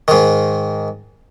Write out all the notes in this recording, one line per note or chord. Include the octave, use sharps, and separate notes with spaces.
G#2 D#3